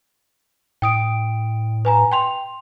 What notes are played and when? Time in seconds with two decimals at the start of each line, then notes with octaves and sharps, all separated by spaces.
0.82 A2 G5 D#6 D7
1.85 B4 G#5 A#5
2.12 G5 C6 F7